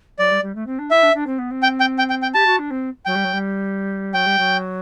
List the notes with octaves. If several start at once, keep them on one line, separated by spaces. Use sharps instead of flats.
F#3 D5
G3
G3
A3
C4
D4
E4 E5
D4
D4
C4
B3
C4
G5
G5
G5
G5
G5
G4 A5
F#4
D4
C4
F#3 G5
G3
F#3
G3
F#3 G5
G3
F#3